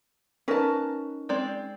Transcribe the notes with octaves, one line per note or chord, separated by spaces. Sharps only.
C#4 D#4 A#4 B4 A5
G#3 C4 D5